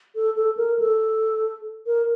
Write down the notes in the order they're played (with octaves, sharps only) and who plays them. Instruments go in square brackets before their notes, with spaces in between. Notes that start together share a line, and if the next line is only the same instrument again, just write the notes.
[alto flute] A4
A4
A#4
A4
A#4